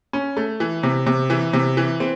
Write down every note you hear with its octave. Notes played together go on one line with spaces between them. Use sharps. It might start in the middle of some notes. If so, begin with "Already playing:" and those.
C#4
A3
E3
C3
C3
E3
C3
E3
C4